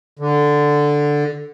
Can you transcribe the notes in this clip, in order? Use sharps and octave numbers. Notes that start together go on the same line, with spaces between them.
D3